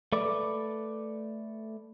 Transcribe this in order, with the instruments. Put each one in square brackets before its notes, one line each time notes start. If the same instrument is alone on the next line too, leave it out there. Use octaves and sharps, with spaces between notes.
[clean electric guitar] A3 B4 D5